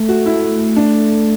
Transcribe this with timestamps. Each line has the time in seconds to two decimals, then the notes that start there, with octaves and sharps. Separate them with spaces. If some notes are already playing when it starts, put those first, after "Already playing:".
Already playing: A3
0.09 F#4
0.26 E4
0.76 D4